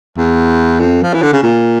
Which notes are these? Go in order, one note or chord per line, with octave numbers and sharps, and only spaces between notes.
E2
F2
F3
E3
D3
C#3
A#2